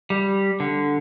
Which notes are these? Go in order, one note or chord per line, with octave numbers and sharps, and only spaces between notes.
G3
D3